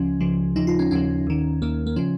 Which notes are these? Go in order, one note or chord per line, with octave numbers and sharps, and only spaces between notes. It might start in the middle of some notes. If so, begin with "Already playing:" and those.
Already playing: C#2 C#3 F3 C#4
C#2 C#3 F3
D#2 C#3 F3 D#4
F4
C#4
D#2 C#3 F3 C#4
D#2 D#3
D#2 D#3 A#3
A#3
C#3 F3 C#4